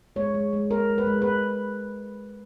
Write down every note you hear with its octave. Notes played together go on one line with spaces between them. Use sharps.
G#3 C#5
G#3
G#3
G#3 A#4
G#3
B4
G#3
B4